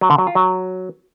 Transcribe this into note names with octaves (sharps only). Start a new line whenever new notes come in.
F#3
D3
F#3
F4
F#3